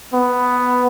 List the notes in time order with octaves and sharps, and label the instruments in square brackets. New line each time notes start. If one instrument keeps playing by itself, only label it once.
[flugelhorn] B3